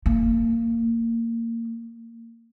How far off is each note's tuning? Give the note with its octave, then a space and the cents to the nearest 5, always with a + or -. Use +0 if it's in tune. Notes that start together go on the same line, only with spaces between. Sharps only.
A#3 -20